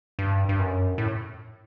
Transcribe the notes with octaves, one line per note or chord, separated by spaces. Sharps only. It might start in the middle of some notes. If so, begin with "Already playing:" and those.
G2
G2
F#2
A2